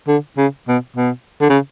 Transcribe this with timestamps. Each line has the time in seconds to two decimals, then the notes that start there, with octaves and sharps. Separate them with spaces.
0.08 D3
0.38 C#3
0.68 B2
0.97 B2
1.41 D3
1.50 C#3